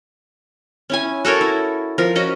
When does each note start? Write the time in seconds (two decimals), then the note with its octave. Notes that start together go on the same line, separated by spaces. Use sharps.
0.90 C#4 E4 G#5
1.25 F#4 A4 A#4 C#5
1.41 E4
1.98 F3 A#4
2.15 C#4 F#4 D#5